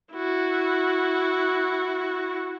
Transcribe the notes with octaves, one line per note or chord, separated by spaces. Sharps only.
E4 F#4